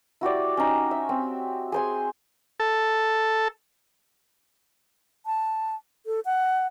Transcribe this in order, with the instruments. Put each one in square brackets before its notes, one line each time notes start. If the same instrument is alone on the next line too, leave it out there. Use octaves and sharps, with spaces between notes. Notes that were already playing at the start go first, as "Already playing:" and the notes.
[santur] E4 F#4 G4 D5
C#4 D#4
E5
C4
G#4 C5 G#5
[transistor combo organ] A4
[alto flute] A5
A4
F#5